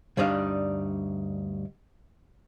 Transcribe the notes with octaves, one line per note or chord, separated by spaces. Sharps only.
D2 G2 G3 D4 D#4 F5